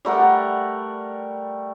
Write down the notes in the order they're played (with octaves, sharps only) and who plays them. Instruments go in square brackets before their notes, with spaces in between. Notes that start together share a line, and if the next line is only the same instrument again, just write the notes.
[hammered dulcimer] G3 A3 A#4 F#5